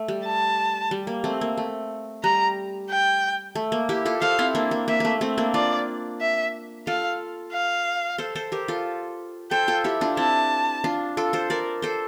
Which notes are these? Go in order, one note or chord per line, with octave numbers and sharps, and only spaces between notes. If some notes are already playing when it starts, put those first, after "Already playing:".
Already playing: A3
G3
A5
G3
A#3
A3 C4
A#3
A3
G3 A#5
G5
A3
A#3
E4 G4
F4 A4
A4 C5 F5
C4 E4
A#3 D4
A#3
A#3 E5
A3 A#3
A3 C4
A#3 D4
D4 F4 D5
E5
F4 A4 F5
F5
A4 C5
A4 C5
G4 A#4
F4 A4
A4 C5 G5
F4 A4
E4 G4
D4 F4
C4 E4 A5
D4 F4
F4 A4
A4 C5
A#4 D5
A4 C5